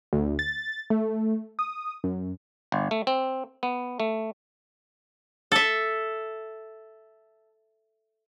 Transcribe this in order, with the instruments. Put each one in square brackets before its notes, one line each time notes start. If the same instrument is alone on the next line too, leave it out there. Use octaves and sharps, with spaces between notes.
[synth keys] D2
A6
A3
D#6
F#2
[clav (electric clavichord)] G1
A3
C4
B3
A3
[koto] A4 E5